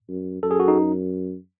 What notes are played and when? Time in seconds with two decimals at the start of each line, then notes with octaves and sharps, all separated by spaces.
0.09 F#2
0.43 F#2 A4
0.51 G#4
0.60 F#4
0.68 D#4